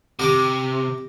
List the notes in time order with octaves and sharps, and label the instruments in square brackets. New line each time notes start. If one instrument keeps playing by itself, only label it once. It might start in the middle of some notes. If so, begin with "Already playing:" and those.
[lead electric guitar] C3 [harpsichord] G4 A#5 D6